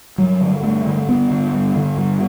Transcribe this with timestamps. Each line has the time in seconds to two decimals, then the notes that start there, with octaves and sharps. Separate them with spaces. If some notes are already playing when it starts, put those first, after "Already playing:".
0.18 G2 F#3
0.41 D3
0.63 G2 A3
0.86 D3
1.08 G2 B3
1.31 D3
1.54 G2
1.76 D3
1.97 G2